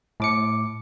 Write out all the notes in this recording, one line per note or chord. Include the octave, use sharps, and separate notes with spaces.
A2 D6 C#7